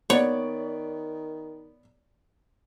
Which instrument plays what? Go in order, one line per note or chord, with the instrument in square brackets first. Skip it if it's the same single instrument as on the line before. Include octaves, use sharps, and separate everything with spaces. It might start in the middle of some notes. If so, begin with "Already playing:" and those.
[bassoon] D#3 [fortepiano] B3 D5 [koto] C#5